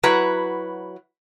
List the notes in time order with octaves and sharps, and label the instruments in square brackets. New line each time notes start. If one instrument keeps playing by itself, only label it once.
[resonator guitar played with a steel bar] F#3 E4 F#4 B4 A#5